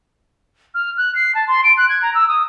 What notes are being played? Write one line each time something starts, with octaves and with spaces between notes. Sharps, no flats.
F6
F#6
C7
A5
C6
D7
F#6
G#6
A#5
E6
D#6